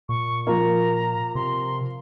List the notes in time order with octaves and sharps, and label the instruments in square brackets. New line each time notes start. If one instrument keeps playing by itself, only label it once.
[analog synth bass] A#2 [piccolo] C#6
[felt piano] F3 A#3 [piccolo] A#5
[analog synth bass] C3 [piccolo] C6